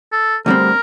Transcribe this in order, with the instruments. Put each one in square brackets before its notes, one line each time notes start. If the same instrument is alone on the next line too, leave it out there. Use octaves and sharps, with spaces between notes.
[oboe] A4
[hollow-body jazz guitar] D2 D3 G3 C4 [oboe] A#4